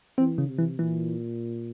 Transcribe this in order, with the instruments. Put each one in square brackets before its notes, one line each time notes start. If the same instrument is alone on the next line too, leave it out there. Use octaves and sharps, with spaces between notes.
[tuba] E3 [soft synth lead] C4
[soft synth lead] C#3
[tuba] C3
[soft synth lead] E3
[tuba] A#2 [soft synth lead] E3